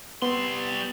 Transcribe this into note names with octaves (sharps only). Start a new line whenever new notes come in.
G3 B3 C6